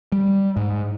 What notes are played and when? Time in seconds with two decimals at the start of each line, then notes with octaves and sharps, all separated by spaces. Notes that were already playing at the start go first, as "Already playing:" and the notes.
0.12 G3
0.57 G#2